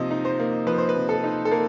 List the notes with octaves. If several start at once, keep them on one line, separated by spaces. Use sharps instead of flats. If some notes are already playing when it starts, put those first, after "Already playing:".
Already playing: C3 F3 A#3 D#4 D#5
D#4
C5
A#3
F3 B4
C5
B4
C3
A4
D#4
A4
A#3 A#4